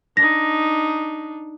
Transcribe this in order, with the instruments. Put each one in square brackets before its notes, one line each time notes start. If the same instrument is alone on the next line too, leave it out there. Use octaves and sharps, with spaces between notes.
[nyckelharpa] D4 D#4 [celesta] A#6